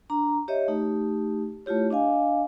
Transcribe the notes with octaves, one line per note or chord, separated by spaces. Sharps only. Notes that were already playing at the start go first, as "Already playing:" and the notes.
D4 A#5
G4 C#5 D#5 E5
A3 D#4 G4
A3 E4 F4 G4 C#5
D4 D#5 F5 G#5